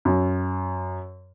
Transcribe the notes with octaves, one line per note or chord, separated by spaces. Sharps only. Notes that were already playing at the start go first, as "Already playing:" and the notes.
F#2